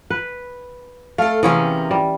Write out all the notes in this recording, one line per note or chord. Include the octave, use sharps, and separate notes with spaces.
B4
A3 A4 F5
C3 E3 A#3 B3 C#4 G#4
G3